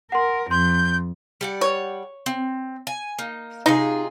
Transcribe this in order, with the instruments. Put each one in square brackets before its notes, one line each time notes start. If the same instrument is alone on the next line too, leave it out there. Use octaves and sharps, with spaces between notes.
[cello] A#4 [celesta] F#5 C6
[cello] F2 [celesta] C6 [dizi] G6
[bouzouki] G3 D5 F#5
[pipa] C#5
[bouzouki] C4
G#5
A#3 D#4
[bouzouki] C3 F4 G#4 [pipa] D#4